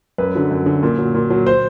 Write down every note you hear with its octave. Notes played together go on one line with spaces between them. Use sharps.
F#2 B4
D3 F#3
F#2
D3 F#3
A#2
F#3
A#2
F#3
C5